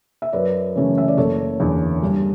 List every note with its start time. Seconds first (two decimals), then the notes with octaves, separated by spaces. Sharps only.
0.22 E5
0.32 F#2 B4 D5
0.76 C#3 E3 A3 C#4
0.98 E5
1.08 D5
1.17 F#1 A4 C#5
1.60 E2 D3
2.02 G2